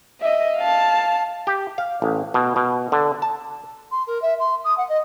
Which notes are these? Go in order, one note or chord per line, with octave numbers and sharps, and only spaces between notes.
D#5 E5
F5 A5
G4
F5
A1
B2
B2
D3
A5
C6
A#4
E5
C6
D#6
F#5
D#5